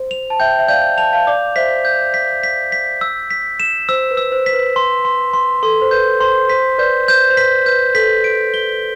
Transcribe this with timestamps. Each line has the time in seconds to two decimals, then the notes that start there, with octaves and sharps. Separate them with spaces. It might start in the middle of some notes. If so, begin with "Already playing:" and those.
Already playing: C5
0.11 F7
0.30 A5
0.39 E5 G5 G6
0.59 E5
0.68 D5 F5 G6
0.97 A5 F7
1.13 F5 A5
1.27 D5 F5 D6
1.56 C5 E5 B6
1.85 G6
2.14 B6
2.43 B6
2.72 B6
3.01 E6
3.30 B6
3.60 E7
3.89 C5 E6
4.11 B4
4.17 E6
4.32 C5
4.46 B6
4.53 B4
4.76 C6
5.05 C6
5.33 C6
5.63 A4 C6
5.81 C5
5.91 B4 G6
6.20 C5 C6
6.49 C5 B6
6.78 B4 D5 G6
7.08 C5 G6
7.30 C5
7.37 B4 B6
7.66 B4 G6
7.95 A4 B6
8.24 D7
8.54 G7